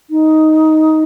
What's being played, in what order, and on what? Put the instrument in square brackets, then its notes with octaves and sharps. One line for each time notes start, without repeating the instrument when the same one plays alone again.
[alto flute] D#4